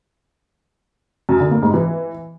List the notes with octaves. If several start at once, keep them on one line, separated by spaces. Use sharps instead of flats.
F#2
D3
A#3
G#2
E3